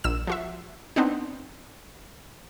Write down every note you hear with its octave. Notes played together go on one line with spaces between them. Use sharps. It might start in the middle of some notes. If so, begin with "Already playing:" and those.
A#1 E6 E7
F3 F#4 E5
B3 C4 D4 D#4